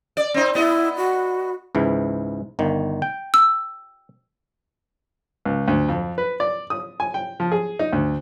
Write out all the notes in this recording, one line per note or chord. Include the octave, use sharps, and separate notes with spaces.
D5
C4 D#4
B3 E4 D#5
F#4
C#2 G#2 E3
G1 D#3
G5
E6
C#2
D2
F2
B4
D5
D#6
G#5
G5
F3
G#4
D#4
D2